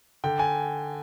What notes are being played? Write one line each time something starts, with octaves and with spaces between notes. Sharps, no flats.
D3 G5
G#5